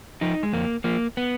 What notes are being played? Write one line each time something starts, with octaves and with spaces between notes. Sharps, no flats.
F3 D#4
G#3
F2 A#3
F3 A#3
B3